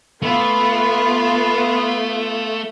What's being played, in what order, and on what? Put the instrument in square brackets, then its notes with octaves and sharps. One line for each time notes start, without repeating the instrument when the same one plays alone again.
[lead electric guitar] A3 [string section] B3 F4 [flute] B5